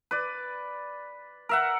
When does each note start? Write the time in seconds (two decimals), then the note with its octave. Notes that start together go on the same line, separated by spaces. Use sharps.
0.11 B4 D5
1.49 A#4 E5 F#5